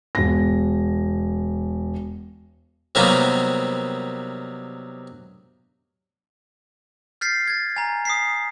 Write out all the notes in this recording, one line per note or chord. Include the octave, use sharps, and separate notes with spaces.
E1 A#6
C3 D#3 F#3 G3 A#3 B3
F6 G6 A6 B6 C7
G#6 A6
G#5 A#5
D#6 B6 C7